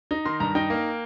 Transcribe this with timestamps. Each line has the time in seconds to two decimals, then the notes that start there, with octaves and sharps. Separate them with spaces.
0.11 D#4
0.25 D#3 C6
0.40 G2 A#5
0.55 D#4 G5
0.70 A#3